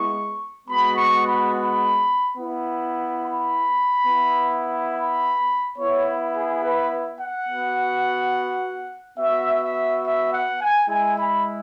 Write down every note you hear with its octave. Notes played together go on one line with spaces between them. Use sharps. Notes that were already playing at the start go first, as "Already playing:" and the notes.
Already playing: G#3 B3 E4 C#6
G#3 B3 F#4 B5
C#6
B5
B5
B3 E4
B5
B3 E4
B5
B3 E4 C#5
G#4
B4
F#5
B3 F#4
B3 F#4 E5
E5
E5
F#5
G#5
G#3 E4 G#5
B5